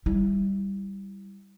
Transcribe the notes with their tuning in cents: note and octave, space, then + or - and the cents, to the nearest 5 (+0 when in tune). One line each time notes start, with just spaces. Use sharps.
G3 +0 E4 +0